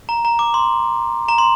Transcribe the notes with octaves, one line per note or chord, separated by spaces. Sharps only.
A#5
A#5
D6
C6
A#5
C6